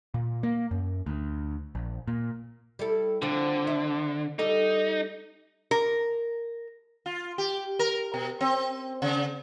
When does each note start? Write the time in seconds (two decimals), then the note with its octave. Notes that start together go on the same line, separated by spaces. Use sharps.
0.14 A#2
0.43 A#3
0.71 F#2
1.06 D2
1.75 A#1
2.08 A#2
2.79 G3 E4 A4
3.22 D3 C4 F4
3.67 E5
4.39 G3 D#4 G4 A4
5.71 A#4
7.06 F4
7.38 G4
7.79 A#4
8.14 B2
8.41 C4
9.02 C#3